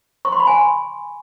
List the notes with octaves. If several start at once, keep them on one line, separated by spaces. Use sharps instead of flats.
C#6
C6
B5
G#5